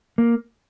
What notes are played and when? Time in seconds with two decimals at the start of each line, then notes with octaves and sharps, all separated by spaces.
0.18 A#3